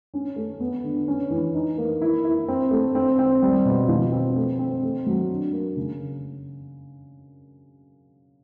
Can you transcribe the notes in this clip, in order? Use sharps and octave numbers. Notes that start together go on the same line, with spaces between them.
C#4
A3
B3
D3
C#4
E3
D#4
A#3
E4
E4
C4
A3
C4
C4
G3
B2
F3
C4
A3
C4
A3
F#3
D4
A#3
C#3